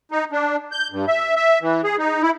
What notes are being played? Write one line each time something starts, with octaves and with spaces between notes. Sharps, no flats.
D#4
D4
G6
G2
E5
E5
E3
G#4
D#4
E4